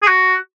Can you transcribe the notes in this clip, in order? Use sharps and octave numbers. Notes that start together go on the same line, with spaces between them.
G#4
F#4